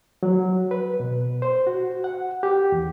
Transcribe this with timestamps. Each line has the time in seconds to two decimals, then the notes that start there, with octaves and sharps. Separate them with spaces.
0.23 F#3
0.71 B4
1.00 B2
1.42 C5
1.67 F#4
2.04 F#5
2.43 G4
2.72 E2